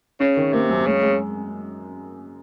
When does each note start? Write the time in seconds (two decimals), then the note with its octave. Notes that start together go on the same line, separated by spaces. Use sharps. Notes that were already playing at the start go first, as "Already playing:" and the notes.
0.20 C#3 C#4
0.37 D#3
0.53 C3 A#3
0.70 F#2
0.86 C#3 G#3
1.03 G#3